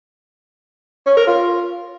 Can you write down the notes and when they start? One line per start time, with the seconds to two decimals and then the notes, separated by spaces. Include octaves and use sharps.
1.06 C#4
1.17 A#4
1.27 F4